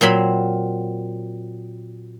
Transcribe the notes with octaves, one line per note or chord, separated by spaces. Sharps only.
A#2 F#3 C4 B5